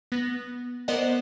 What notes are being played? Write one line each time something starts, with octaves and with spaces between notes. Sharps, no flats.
B3 A#6
B3 A#4 C5 D5 D#5 F#5